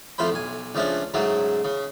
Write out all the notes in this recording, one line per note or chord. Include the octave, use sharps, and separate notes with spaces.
F2 F3 A3 C5 B5
B1 G#5
C#2 F3 A3 C#4 D4
G#2 C#3 F#3 A3
C#3